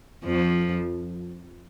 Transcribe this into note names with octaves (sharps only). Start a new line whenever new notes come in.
F2 F3